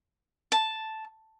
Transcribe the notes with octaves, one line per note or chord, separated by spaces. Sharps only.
A5